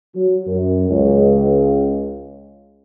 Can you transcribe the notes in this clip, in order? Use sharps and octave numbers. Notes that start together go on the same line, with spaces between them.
F#3
F#2
C#2